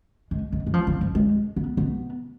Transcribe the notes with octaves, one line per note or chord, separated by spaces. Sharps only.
G#3
G#3
G#3
F3
E3
F3
G#3
B3
B3